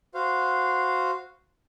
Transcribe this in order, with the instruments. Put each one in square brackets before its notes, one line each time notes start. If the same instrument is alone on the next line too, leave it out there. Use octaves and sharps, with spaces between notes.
[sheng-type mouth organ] F#4 C5 F5